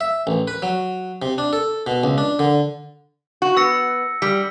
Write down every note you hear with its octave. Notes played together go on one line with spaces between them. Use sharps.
E5
A1
B4
F#3
C3
D4
A4
B2
C#2
D4
D3
F#4
B3 E6 A#6 C#7
G3 B6